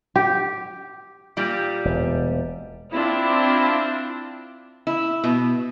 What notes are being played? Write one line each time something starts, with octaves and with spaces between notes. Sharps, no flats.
G4
A#2 G3
E1
C4 D4 E4 F4
E4
B2